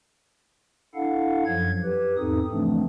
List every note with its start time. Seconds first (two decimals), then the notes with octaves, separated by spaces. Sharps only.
0.95 D4 E4 A4 F5 F#5
1.45 F#2 F3 F#3 G#6
1.84 G4 B4
2.17 E2 G#2 C4 D#4 A4 D#6
2.51 C#3 E3 F3 A3 C4 D4